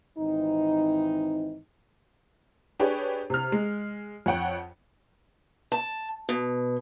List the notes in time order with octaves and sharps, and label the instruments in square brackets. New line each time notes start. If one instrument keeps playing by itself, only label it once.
[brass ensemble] G#1 E3 C4 D#4
[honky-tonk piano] D4 G4 G#4 B4 C#5
C3 F6
G#3
F2 C#5 F#5 G5
[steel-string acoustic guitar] A5
B2